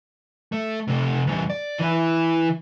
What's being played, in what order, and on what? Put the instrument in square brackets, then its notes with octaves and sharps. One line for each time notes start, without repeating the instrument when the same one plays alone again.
[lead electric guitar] A3
C3 A3
E2 G3
D5
E3 E4